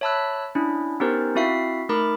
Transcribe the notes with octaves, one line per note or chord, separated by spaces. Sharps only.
C#5 E5 A5 B5 E6 F#6
C#4 D4 E4
B3 C#4 D#4 G4 A#4 C5
C4 E4 F#4 E5 F5 C7
A3 D#4 A#4 B5 D6